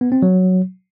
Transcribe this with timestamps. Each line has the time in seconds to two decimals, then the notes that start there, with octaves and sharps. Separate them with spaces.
0.01 B3
0.12 C4
0.22 F#3